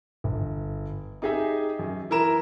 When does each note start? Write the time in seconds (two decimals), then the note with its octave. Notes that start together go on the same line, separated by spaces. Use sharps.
0.24 G1
1.22 D#4 G4 G#4 D#5 E5
1.79 F#2
2.10 E3 E4 A#4 A#5 E7